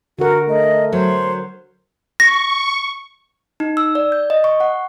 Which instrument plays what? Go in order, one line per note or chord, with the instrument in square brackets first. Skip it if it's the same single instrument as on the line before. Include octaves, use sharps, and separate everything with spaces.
[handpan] D3 A#4 [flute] F#4
[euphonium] A3 [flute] D#5
[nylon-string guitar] F#3 [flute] C5
[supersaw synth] C#6 [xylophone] A#6
[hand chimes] D#4
E6
D5
G6
D#5
C#6
F#5